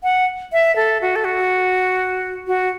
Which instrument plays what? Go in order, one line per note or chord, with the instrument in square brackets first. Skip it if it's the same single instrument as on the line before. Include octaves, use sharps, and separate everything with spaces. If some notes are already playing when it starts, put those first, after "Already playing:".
[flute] F#5
E5
A4
F#4
A4
F#4
F#4